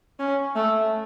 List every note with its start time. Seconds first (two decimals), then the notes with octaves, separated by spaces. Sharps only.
0.20 C#4
0.56 A3